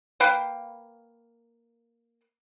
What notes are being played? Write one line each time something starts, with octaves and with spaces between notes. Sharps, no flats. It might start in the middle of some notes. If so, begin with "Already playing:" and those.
A#3 B4 F5 G5